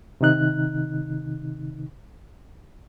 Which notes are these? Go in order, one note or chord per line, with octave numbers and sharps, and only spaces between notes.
C3 D#3 D#4 F#6